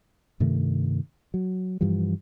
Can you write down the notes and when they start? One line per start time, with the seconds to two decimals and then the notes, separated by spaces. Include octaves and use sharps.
0.40 G2 C3 D#3 A3
1.34 F#3
1.81 G2 E3 F3 G3